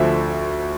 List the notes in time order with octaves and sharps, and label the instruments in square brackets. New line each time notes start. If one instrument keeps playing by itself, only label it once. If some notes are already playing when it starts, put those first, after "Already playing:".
Already playing: [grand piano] D2 D3 F3 E5